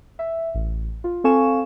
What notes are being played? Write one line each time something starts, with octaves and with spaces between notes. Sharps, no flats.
E5
A1
F4
C4 A4 F5 G#5 C#6 E7